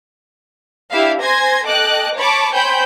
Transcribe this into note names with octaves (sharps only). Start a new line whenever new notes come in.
D4 E4 G4 E5 F5
C5 G#5 C6 G#6 A#6
A4 D#5 G5 D6 F#6
C#5 A5 B5 C#6 D6
C5 C#5 G5 G#5 B5 G6